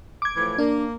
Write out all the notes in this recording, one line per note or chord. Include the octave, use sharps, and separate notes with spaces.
D6 G#6
A2 E3 F3
A#3 D4